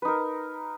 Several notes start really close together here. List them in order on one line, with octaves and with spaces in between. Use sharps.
B4 D#4 A#4